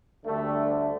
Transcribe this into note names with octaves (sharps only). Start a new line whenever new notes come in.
D2 D3 G3 A3